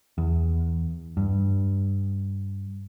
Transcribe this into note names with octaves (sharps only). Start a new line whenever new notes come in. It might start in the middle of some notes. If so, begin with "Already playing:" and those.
E2
G2